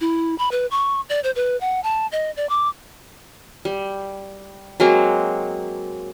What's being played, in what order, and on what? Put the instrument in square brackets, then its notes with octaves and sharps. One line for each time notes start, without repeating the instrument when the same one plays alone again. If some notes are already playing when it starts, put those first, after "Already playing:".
[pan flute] E4
B5
B4
C#6
D5
C5
B4
F#5
A5
D#5
D5
D6
[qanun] G3
F#3 G#3 A#3 C4